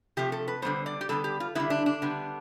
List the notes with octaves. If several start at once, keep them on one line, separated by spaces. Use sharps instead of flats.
C3 F3 A3 G4
A4
B4
D3 G3 B3 C5
D5
G4
D3 G3 B3 A4
G4
F4
D3 G3 B3 E4
D4
D4
D3 G3 B3